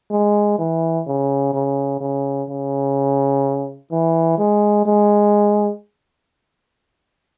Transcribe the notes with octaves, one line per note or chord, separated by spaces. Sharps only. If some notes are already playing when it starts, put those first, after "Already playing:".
G#3
E3
C#3
C#3
C#3
C#3
E3
G#3
G#3